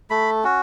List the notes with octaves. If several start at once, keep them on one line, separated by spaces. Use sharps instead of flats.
A3 B5
C#4 F#4